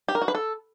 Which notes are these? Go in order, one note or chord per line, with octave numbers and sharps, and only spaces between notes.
G4
A#4
F#4
B4
A4